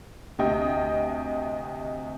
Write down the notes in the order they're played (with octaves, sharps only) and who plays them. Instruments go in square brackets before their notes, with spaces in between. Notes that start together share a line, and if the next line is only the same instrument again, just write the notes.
[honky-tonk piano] D2 C3 D#5 G5